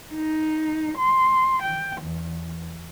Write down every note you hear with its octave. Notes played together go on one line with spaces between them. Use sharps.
D#4
C6
G5
E2